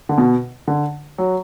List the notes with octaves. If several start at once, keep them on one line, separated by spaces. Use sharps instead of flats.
D3
B2
D3
F#3